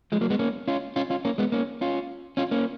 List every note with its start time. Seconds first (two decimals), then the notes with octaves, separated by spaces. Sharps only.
0.12 F3 G#3
0.21 F#3 A#3
0.30 G#3 B3
0.39 A#3 C#4
0.68 C#4 F4
0.96 C#4 F4
1.10 C#4 F4
1.25 A#3 C#4
1.38 G#3 B3
1.52 A#3 C#4
1.81 C#4 F4
2.37 C#4 F4
2.51 A#3 C#4